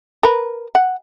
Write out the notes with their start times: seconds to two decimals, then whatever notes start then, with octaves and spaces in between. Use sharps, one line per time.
0.23 A#4 B4
0.75 F#5